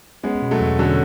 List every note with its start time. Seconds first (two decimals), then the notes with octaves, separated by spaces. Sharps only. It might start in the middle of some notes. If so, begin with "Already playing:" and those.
0.23 G#3 B3 C#4
0.42 B2
0.51 F#3 A3
0.60 E2
0.79 D3 F#3 C#4